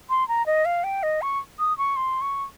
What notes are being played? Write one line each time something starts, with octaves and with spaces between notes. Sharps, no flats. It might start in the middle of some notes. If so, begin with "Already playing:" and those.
C6
A#5
D#5
F5
G5
D#5
C#6
D#6
C#6
C6
C#6